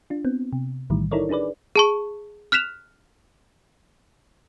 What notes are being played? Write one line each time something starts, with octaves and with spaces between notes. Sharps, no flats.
D4 F4
B3 C4
C3
B1 A2 D#3 E3 G3
D#4 E4 A4 A#4 C#5 D5
D4 D#4 G#4 B4 D5
G#4 A5 C#6
F6 F#6 B6 E7 F7